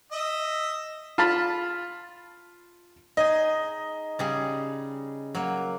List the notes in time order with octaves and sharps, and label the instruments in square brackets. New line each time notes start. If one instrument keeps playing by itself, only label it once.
[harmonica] D#5 E5
[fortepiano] F4 A5 B5
[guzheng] D#4 G#4 [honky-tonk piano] D#5
[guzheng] C#3 G3 G#4
F#3 A#3